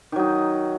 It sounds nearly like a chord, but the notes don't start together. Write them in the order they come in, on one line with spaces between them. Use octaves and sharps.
D#3 F#3 D#4